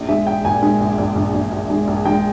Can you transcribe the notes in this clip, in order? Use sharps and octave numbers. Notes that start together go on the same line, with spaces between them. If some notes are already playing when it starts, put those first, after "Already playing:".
Already playing: A#1
G#3 E5
A#1 G5
A#2 G#5
G#3
A#1
A#1
A#1
A#1
A#1
G#3
A#1
G#3 G5